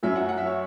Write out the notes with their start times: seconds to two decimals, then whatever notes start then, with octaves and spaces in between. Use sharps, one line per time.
0.03 F#2 F#3 E5
0.15 F#5
0.29 F#5
0.37 E5
0.46 C#5